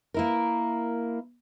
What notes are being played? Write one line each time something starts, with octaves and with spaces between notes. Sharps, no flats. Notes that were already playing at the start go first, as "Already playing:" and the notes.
A#3 E4 A#4